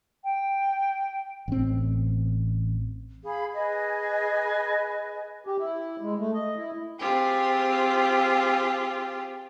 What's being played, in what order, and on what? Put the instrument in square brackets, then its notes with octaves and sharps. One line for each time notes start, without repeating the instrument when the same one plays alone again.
[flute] G5
[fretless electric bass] A1 C4
[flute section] G#4 F5 B5
G#4 B4 D#5 G#5
[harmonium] G4
E4
G#3
A3
D#5
E4
[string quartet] C4 F4 G4 G#4